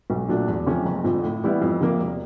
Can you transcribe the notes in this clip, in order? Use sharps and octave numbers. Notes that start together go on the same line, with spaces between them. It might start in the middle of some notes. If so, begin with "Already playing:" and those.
B1
A#2 F#3 A3 D4
E2
C3 F3 A3 C#4
F#1
F2 D3 F3
A2
E3 G3 B3 E4
F2
C3 F3 A#3
E1